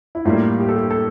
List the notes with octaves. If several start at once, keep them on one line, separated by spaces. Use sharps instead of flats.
E4
A2 G3 A#3 F4
G4
A4
G4
A4